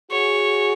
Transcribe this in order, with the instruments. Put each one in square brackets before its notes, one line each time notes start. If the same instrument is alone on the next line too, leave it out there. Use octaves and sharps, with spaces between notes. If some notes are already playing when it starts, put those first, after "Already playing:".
[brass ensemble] F#4 G#4 [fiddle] C#5